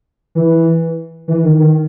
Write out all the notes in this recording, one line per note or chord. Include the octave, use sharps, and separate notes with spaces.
E3
E3
D#3
D#3